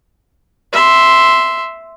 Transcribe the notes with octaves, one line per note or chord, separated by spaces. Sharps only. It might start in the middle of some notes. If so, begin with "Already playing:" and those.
E5 C6